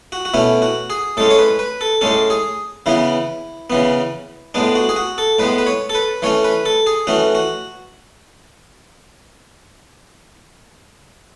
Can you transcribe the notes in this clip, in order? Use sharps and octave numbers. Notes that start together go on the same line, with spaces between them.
F#4
F#4
B2 A3 C#4 E4
F#4
G#4
A2 G#3 C#4 A4
C#5
B4
B4
A4
A2 G#3 C#4 A4
G#4
C#3 E3 B3 E4
C#3 E3 B3
A2 G#3 B3 D4
F#4
G#4
F#4
A4
A2 G#3 B3 B4
B4
C#5
A4
B4
E3 A3 C#4 C#5
B4
A4
G#4
E3 A3 C#4 F#4
F#4